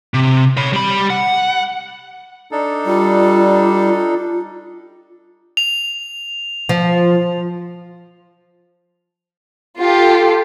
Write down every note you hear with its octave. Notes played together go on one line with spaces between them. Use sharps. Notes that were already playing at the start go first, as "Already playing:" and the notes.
C3
C#5 B5
G3 B5
F#5
D4 D#4 A4
G3 F4
F7
F3
F4 G4 A4